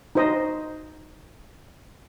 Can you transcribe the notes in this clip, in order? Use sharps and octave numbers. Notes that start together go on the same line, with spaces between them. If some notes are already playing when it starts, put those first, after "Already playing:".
D#4 F#4 C5 D#5